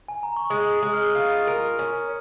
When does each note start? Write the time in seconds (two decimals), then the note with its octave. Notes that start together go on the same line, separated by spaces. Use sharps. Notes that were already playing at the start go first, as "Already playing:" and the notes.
0.08 G#5
0.23 A#5
0.36 C#6
0.50 G#3 D#6
0.71 D#6
0.82 G#3
0.93 F6
1.15 F4
1.47 A#4
1.79 C#4